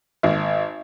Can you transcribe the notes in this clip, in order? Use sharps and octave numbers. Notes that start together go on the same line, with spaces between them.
G#1